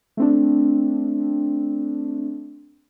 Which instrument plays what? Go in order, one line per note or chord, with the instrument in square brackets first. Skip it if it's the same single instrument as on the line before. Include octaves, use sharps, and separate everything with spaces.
[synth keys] A3 C4 D4